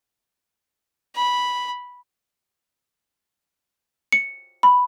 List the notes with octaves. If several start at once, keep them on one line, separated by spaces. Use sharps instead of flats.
B5
C#7
B5